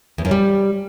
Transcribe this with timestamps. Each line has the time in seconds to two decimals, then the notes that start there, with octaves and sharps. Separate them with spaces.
0.18 E2
0.25 F#2
0.31 G3